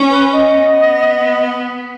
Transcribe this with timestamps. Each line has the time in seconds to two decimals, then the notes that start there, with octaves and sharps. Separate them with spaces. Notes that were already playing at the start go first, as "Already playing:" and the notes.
Already playing: C#4
0.10 B4
0.33 D#5
0.55 B3